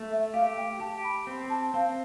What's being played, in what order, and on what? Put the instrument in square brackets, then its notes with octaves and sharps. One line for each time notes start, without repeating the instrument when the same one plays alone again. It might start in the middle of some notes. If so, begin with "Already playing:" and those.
Already playing: [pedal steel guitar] A3
[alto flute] E5
[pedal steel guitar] G4 [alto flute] F5
[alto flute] G5
[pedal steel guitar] G4 [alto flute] A5
[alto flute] B5
[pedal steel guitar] C4
[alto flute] A5
[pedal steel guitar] C4 [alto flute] F5